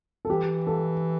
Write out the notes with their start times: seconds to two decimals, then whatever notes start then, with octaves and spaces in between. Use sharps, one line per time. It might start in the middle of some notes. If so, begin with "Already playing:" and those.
0.25 A4
0.29 E3 G4
0.67 A4